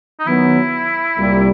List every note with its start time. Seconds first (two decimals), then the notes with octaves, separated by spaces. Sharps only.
0.19 D#4
0.26 D#3 F#3 B3 E4
1.18 C2 A#2 G3